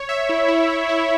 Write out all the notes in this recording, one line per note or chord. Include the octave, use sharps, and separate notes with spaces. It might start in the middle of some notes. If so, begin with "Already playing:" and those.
Already playing: C#5
E5
E4
E4
E4
E4